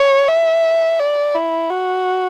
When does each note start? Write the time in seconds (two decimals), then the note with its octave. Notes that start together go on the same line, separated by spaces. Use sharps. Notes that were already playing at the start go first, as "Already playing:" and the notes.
Already playing: C#5
0.28 E5
0.99 D5
1.35 E4
1.70 F#4